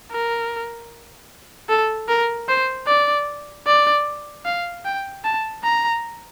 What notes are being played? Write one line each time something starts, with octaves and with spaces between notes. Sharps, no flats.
A#4
A4
A#4
C5
D5
D5
F5
G5
A5
A#5